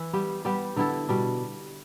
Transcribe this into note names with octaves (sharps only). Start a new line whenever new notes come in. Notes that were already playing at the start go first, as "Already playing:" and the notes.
Already playing: E3 E4
G3 B3 G4
G3 B3 G4
D3 B3 E4 A4
B2 G3 D4